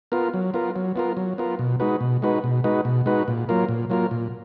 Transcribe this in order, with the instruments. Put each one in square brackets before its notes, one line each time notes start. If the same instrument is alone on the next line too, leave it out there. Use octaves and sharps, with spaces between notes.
[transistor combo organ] B3 F4 A#4
F#3
B3 F4 A#4
F#3
B3 F4 A#4
F#3
B3 F4 A#4
B2
G#3 D#4 F#4 B4
B2
G#3 D#4 F#4 B4
B2
G#3 D#4 F#4 B4
B2
G#3 D#4 F#4 B4
A#2
F#3 A#3 F4 A#4
A#2
F#3 A#3 F4 A#4
A#2